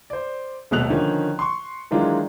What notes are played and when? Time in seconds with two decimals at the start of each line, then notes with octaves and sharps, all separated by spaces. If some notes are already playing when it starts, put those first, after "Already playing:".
0.10 C5 D5
0.71 D#1 B2 A3 F#6 F7
0.90 D3 D#3 F3 C#4
1.39 C6 C#6
1.91 D#3 E3 F#3 G#3 D4 F4